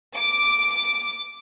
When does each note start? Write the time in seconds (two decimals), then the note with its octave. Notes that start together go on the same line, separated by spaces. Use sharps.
0.16 D6